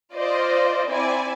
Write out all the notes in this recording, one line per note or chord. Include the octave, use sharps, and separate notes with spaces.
F4 C5 D5 D#5
C4 E4 D5 G#5